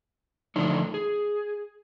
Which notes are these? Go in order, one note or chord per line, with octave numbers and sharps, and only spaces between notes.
D3 F3 A3 D4 D#4
G#4